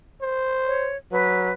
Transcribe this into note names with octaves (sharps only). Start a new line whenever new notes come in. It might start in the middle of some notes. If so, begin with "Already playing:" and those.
C5
C#5
F#3 B4